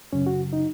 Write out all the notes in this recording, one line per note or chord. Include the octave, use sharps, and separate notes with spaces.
F#2 C#3 C#4
F#4
D#4